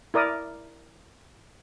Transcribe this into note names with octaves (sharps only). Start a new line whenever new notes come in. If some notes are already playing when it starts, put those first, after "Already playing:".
E4 A#4 D5 D#6